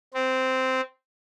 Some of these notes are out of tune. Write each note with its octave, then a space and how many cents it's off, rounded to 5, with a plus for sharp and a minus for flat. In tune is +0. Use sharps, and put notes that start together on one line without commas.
C4 -10